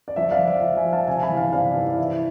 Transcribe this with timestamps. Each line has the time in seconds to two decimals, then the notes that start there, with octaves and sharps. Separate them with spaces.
0.08 D5
0.16 F2 E5
0.31 D5 F5
0.39 F2
0.47 E5
0.62 F2
0.77 E5 G#5
0.85 F3
0.92 F5 A5
1.07 C3 E5 G#5
1.18 A5
1.22 G#5 B5
1.30 E2
1.37 F5 A5
1.53 C3 D5 F5
1.75 E3
1.87 D5
1.98 E3 E5